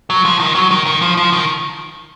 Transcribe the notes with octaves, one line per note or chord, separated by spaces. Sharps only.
F#3
F3
D#3
F#3
D#3
D#3
F3
F3
D#3